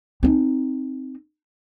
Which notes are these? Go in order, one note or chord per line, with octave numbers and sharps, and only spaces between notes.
C4 D#4